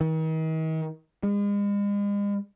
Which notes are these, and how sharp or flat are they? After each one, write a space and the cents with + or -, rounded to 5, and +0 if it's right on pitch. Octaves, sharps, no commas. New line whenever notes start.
D#3 +40
G#3 -40